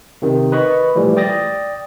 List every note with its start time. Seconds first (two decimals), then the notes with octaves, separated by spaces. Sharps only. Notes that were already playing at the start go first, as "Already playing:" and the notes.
0.22 C3 D#3
0.52 B4 D#5 B5 C#6
0.95 A#2 E3 F3 G3 A3
1.17 D5 G5 D#6 A6 A#6